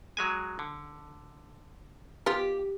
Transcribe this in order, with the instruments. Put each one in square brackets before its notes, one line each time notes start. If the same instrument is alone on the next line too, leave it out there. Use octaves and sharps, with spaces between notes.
[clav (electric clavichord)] F#3 G#3 G#5
D3
[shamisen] D#3 B3 F4 [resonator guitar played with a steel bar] G4